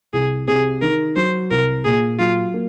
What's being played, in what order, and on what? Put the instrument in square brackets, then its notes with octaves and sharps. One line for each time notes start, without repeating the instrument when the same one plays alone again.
[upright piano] C2 [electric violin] G#4
[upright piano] C3 [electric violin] G#4
[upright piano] D#3 [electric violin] A#4
[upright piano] F#3 [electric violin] C5
[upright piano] C2 [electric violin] A#4
[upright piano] A#2 [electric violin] G#4
[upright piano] F#3 [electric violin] F4
[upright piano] A#3